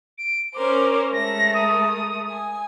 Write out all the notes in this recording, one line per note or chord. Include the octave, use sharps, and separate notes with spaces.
D7
C#4 A#4 C5 D6
G#3 A3 A#4 A#6
D#6
G#5